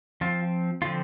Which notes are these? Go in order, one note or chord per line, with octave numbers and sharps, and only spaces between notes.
F3 C4 F4
D3 F3 C4 F4